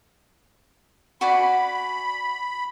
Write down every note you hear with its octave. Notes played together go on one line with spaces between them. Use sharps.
F#4 D5 G#5 B5